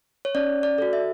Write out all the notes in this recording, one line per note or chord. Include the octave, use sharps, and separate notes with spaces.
C#5
C#4 D5
D5
F#4 A4
E5